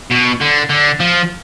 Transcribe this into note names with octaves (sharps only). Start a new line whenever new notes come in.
B2
D3
D3
F3